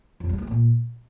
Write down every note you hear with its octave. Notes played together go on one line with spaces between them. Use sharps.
F2
G3
A3
A#2